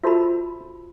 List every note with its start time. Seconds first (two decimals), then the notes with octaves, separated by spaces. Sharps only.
0.03 F4 F#4 A4 C5 E5 B5